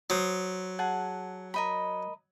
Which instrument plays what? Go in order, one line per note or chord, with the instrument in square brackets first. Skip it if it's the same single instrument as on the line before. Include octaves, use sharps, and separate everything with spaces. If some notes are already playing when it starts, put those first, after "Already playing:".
[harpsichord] F#3 [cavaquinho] C5 D#6
[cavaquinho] G#4 F#5 A5
A#4 D#5 B5